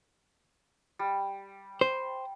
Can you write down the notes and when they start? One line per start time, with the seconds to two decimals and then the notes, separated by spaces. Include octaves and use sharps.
0.99 G3
1.81 C5